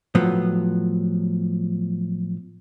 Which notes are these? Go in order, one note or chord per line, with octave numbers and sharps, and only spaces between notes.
A2 F3 F#3 B3